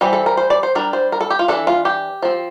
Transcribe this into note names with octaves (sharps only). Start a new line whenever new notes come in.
E3 G3 C4
A4
A#4
C5
D5
C5
G3 D4 A#4
C5
A#4
A4
G4
F4
E3 A3 D4 A4
F4
G4
F3 C4